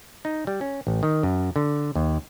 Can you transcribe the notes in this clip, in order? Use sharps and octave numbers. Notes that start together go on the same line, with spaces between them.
D#4
G3
C#4
A1
D#3
F#2
D3
D#2